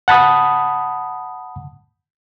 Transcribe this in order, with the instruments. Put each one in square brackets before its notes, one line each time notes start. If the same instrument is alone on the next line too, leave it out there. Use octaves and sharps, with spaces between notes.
[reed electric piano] F#5 A5 B5 D#6